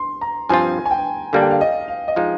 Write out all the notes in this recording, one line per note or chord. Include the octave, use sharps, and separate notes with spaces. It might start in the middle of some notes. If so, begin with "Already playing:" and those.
Already playing: C6
A#5
G2 F3 C4 F4 G#5
G#5
G5
D3 G3 A#3 D4 F5
G5
F5
D#5
F5
D#5
F3 G#3 D#4 F5